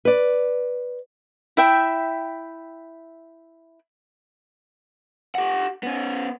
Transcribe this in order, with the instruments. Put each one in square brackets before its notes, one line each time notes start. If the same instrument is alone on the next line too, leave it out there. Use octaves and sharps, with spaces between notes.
[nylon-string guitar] B4 D5
[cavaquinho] E4 E5 G5
[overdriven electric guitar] G4 F#5
B3 C#4